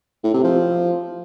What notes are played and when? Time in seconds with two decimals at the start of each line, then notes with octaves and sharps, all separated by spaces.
0.24 A2
0.34 C3
0.44 F3